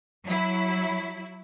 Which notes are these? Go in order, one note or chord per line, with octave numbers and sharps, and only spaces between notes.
F#3 E4